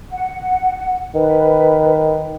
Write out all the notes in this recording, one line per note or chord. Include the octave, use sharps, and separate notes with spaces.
F#5
D#3 B4